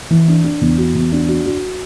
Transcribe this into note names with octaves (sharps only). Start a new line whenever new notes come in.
E3
D4
D4
E2
F#4
E2
D4
F#4
F#4